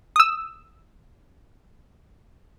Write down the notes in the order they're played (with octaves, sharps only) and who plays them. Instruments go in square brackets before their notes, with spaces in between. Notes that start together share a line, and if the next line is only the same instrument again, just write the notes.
[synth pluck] D#6 E6